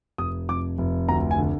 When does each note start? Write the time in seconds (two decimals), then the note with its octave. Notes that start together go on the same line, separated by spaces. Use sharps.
0.18 F1 D#6
0.49 F2 D6
0.78 F1
1.08 D2 A#5
1.31 G#5
1.38 D3